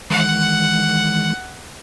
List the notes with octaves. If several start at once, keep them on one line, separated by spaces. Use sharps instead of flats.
D#3 E3 G#3 F#5